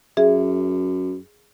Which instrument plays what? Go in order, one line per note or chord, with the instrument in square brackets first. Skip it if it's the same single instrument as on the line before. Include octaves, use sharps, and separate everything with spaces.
[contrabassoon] F#2 [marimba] G#4 E5